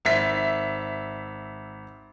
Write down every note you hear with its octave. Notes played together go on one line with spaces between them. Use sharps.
G#1 E5 B6